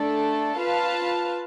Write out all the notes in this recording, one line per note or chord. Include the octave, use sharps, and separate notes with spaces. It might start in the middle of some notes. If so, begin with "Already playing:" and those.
Already playing: A3 D4 A4 D5
F4 B4 F5 A5